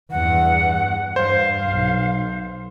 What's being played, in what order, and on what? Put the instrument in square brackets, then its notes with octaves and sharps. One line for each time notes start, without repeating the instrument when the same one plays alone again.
[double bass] E2 G2 [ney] F#5
[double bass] G2 [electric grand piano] C5 [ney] F5
[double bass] B1